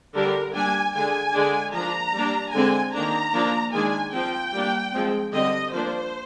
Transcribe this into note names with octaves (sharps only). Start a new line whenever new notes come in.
D3 G3 D4 A#4
G3 A#3 D4 G#5
D3 G#3 D4 G#5
D3 G#3 D4
F3 A#3 D4 A#5
G3 A#3 D4
D3 G#3 C4 G#5
D#3 A#3 D4 A#5
F3 A#3 D4
D#3 G#3 D4 G#5
F3 C4 G5
G3 A#3 D4
F3 G#3 C4
D3 G3 C4 D#5
F3 A#3 D4 C5